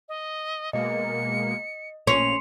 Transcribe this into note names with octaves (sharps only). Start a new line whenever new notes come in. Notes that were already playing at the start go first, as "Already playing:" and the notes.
D#5
B2 G#3 A#3 D#5 C#7
A#1 A#2 C#4 C6 C7 C#7 F7